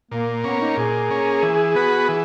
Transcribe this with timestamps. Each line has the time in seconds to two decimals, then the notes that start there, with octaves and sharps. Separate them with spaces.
0.11 A#2 A#3
0.44 A#3 B3 C#4
0.61 D#4
0.77 A#2 G#4
1.10 A#3 C#4
1.43 E3
1.75 B3 F#4 B4
2.09 E3 G#4